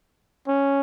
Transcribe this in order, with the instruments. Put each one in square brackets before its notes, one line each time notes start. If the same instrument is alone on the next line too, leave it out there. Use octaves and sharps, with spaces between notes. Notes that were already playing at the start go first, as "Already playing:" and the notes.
[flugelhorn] C#4